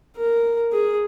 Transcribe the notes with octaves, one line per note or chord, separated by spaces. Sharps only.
A#4
G#4